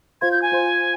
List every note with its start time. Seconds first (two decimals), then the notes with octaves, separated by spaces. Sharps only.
0.21 F4 C5 F5 C6 G#6
0.32 G6
0.42 G#5
0.52 F4 C5 F5 C6